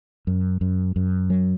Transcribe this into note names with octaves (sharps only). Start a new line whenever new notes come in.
F#2
F#2
F#2
F#3